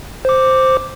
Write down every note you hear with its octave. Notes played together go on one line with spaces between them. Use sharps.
C5 D6